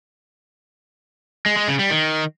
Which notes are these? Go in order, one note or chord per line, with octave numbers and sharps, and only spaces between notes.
G#3
G#3
C#3
G3
D#3